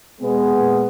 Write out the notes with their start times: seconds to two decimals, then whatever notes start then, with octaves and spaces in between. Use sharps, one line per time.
0.21 B2 G#3 B3
0.52 A#2